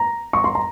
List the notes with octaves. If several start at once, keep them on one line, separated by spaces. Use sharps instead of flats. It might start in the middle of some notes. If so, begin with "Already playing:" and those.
Already playing: A#5
C#6
C6
A#5